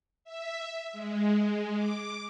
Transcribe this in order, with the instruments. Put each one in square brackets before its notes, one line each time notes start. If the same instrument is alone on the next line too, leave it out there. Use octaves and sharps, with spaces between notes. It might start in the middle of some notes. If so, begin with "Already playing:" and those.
[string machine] E5
G#3
D6